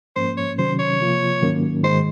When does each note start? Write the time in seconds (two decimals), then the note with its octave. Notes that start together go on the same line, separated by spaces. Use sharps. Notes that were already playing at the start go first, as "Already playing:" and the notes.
0.16 G#2 F3 A#3 C#4 C5
0.37 C#5
0.58 C3 D#3 F#3 C#4 C5
0.79 C#5
1.00 C3 F3 A#3 F4
1.42 G#2 D#3 F#3 A#3 C#4
1.83 G#2 D#3 G#3 D#4 C5